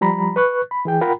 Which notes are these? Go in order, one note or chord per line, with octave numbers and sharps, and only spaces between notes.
F3 G3 A#5 B5
B4 C#6 F#6
B5
E3 G#4 G5
F4 A#4 F#5 G5 A#5 B5